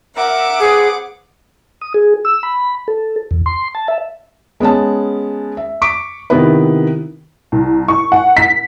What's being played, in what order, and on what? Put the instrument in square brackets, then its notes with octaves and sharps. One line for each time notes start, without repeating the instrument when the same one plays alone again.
[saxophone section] A#4 E5 [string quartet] F#5 D6
[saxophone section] C4 B4 [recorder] G#4
[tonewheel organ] D#6
G#4
E6
B5
A4
E2
C6
A5
E5
[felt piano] G#3 B3 C#4 A5
E5
C#6 D6 B6 D7
C3 D#3 B3 E4 B4
[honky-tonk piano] C2
C#6
F#5
B6